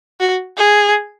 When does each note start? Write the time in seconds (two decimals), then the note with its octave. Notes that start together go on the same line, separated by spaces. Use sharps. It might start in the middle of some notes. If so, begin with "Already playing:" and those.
0.20 F#4
0.58 G#4